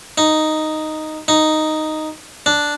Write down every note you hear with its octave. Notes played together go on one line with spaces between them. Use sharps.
D#4
D#4
D4